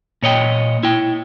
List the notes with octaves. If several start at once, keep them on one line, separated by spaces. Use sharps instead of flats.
A#2 C#5 D#5 G5
E4 G5